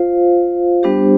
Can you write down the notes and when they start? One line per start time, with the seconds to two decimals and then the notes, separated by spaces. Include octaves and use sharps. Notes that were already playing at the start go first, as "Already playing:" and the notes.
Already playing: F4 C5 F5
0.83 G3 B3 D4 G4 C5